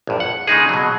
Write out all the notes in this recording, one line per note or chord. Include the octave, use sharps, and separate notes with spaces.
A#1 G2
F#5
C#3 G#3 D#4 G#4
B2 F#3